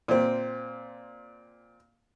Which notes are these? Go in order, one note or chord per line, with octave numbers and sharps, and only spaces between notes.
A#2 C4